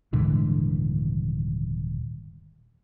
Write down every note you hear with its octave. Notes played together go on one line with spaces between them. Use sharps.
D#1 G#2 D3 E3